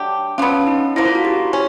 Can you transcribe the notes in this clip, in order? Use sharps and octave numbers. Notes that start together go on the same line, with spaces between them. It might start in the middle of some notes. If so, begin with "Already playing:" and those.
Already playing: F#3 A3 D4 G4
F#3 B3 C#4 D4 F4
D#4
D3 F3 A#3 E4
F4
F#4
G4
C#4